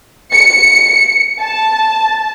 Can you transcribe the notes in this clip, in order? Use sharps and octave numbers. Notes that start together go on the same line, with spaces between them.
C#7
A5